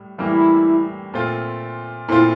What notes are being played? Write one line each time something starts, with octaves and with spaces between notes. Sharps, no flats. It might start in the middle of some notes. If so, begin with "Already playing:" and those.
Already playing: A2 G3
A2 E3 G3 A#3 E4
A#2 A3 C4 F4
A#2 A3 C4 E4 F4